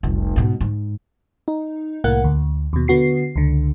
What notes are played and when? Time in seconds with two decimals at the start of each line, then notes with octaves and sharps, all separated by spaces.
0.03 F1 C2
0.36 G#2 B2
0.61 G#2
1.48 D#4
2.04 C2 A2 A#3 F#5
2.24 D2
2.73 D#2 B2
2.88 D3 B3 F#4 C7
3.36 C#2 D3